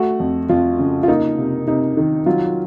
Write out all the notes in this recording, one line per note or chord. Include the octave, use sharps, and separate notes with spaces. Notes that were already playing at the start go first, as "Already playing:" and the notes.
Already playing: A3 F#4
F2
F2 F4
C#3
F4
A#3 D#4
C3
C3 D#4
D#3
F#3 F4